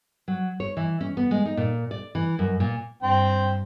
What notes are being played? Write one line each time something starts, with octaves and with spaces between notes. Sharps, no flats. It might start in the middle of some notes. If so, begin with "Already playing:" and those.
F#3
C#5
E3
C#4
B3
G#3
D#4
A#2
D5
E3
F#2
A#2
G2 C4 G5